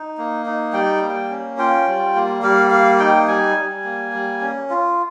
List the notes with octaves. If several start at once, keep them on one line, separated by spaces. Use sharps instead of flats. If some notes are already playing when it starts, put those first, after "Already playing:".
Already playing: D#4
A#3
D#4
G3 G5
A#3
C#4
F4 G5
G3
A#3
G3 F5
A#3 F5
D#4 G5
G3 G#5
G3
A#3
G3
C#4
F4